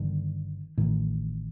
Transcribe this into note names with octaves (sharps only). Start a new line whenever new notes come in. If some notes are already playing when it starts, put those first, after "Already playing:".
Already playing: G1 G2 D3 D#3
A1 A2 D#3